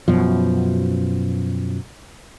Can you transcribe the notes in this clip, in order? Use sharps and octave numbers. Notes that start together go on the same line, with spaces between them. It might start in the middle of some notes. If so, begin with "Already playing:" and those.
F#2 B2 F3